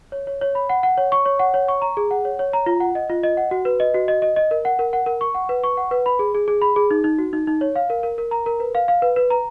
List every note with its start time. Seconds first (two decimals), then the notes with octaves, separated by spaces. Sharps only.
0.12 C#5
0.27 C#5
0.41 C#5
0.55 B5
0.69 F#5
0.83 F#5
0.97 C#5
1.12 C#6
1.26 C#5
1.39 F#5
1.54 C#5
1.68 C#6
1.82 A#5
1.97 G#4
2.11 F#5
2.25 C#5
2.39 C#5
2.53 A#5
2.66 F4
2.80 F#5
2.95 D#5
3.09 F4
3.23 D#5
3.37 F#5
3.51 F#4
3.65 B4
3.80 D#5
3.94 F#4
4.08 D#5
4.22 D#5
4.36 D#5
4.51 A#4
4.65 F#5
4.79 A#4
4.93 F#5
5.06 A#4
5.21 C#6
5.35 F#5
5.49 B4
5.64 C#6
5.77 F#5
5.91 B4
6.06 B5
6.19 G#4
6.35 G#4
6.48 G#4
6.62 B5
6.76 G#4
6.91 D#4
7.04 D#4
7.18 F#4
7.33 D#4
7.47 D#4
7.61 C#5
7.76 F5
7.90 A#4
8.03 A#4
8.18 A#4
8.31 A#5
8.46 A#4
8.60 B4
8.75 F5
8.88 F5
9.02 B4
9.16 B4
9.30 A#5